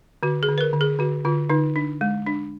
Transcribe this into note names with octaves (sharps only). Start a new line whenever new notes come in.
D3 F#4
G#4
D3
B4
A#4
D3
G#4
D3 F#4
D3 F4
D3 D#4
D4
G#3
D4